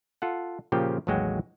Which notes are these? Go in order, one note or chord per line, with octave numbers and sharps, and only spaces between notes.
F4 A4 F#5
A#2 C#3 F3 G4 G5
A1 D#2 F#3 G#3 F#4 G5